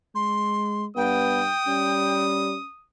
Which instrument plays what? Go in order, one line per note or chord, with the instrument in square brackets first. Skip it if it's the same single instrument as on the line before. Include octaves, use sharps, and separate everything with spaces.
[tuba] G#3 [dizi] C6
[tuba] G2 [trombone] B3 [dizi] G5 [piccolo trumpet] D#6
[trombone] G3 [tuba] C#4